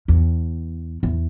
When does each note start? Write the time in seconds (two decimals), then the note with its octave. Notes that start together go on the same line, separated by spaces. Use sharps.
0.08 E2
1.03 E2